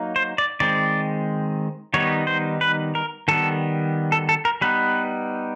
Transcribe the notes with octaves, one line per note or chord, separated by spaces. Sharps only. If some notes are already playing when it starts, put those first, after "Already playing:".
Already playing: F#3 A#3 D#4
C5
D5
D#3 G#3 C4 D5
D#3 G3 B3 D#4 C#5
C5
B4
A#4
D#3 G3 B3 A4
A4
A4
A#4
G3 B3 D#4 B4